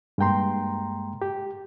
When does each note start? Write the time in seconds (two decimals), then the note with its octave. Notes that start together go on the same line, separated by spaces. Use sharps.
0.18 G2 G#3 A#3 G5 A#5 C6
1.22 G4